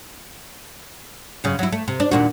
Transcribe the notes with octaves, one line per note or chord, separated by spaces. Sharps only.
F#2 C#3
F#3 E4
A3
C3
D4
D#2 A#2 F#4